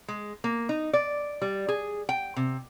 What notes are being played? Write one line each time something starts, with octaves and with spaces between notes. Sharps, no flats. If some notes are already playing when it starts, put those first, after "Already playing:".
G#3
A#3
D#4
D5
G3
G#4
G5
C3